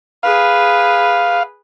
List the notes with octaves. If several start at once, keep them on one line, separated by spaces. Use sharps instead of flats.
G#4 B4 F5